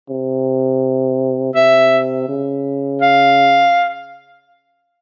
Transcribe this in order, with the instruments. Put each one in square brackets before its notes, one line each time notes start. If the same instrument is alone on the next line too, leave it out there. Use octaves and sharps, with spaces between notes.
[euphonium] C3
[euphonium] C3 [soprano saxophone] E5
[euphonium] C#3
[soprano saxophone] F5